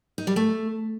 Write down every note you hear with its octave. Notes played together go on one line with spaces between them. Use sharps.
D#4
G3
A3